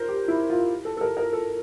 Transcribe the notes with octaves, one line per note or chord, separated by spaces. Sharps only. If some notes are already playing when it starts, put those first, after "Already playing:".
Already playing: A#4 C5
G4
E4
F4
A4
A4
A#4
A#4
A4